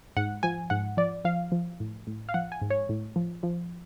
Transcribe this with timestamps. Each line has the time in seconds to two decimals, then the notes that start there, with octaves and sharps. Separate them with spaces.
0.17 G#2 F#5
0.43 F3 G#5
0.70 G#2 F#5
0.97 F3 D5
1.25 F3 F5
1.52 F3
1.80 A2
2.07 A2
2.29 F5
2.34 F3 F#5
2.52 G#5
2.62 G#2
2.70 C#5
2.89 A2
3.16 F3
3.43 F3